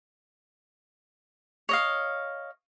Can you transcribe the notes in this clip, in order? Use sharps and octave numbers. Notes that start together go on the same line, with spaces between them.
C#5 D#5 F5